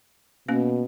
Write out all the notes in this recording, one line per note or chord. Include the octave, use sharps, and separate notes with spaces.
B2 A#3 C#4